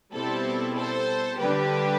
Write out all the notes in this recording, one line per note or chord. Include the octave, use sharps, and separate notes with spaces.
B2 G3 C4 E4 A4 C5
A4 C5
D3 G3 D4 G4 B4